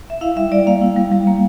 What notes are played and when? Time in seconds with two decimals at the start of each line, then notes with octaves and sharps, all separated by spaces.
0.10 E5
0.21 E4 F5
0.36 G3 E5
0.52 G3 D5
0.67 A#3 F5
0.81 E4
0.97 G3
1.11 G3
1.27 A#3